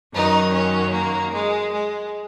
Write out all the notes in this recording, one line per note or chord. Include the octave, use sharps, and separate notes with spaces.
F#2 D#3 F#3 D#4
C#4
A#3
G#3
G#3